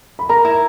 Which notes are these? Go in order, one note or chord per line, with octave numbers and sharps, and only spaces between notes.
B5
A#4 A#5
E4